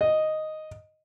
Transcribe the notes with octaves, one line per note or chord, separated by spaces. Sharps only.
D#5